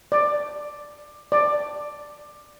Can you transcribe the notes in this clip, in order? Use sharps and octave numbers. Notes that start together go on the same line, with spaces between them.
D5
D5